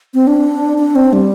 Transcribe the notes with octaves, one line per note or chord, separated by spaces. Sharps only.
C4
D4
D4
C4
G3